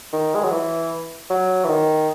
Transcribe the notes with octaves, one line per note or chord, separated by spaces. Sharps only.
D#3
G#3
F#3
E3
F#3
E3
D#3